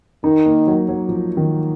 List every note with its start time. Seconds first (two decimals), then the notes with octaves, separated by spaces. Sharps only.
0.24 D#3 D#4
0.46 A#3
0.67 F#3
0.89 F#3
1.09 F3
1.37 D#3